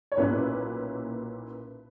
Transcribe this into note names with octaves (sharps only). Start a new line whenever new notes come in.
C#5
B1 A#2 A#3 C#4 E4 B4